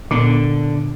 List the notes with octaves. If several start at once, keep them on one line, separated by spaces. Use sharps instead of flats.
A#2 D3 B3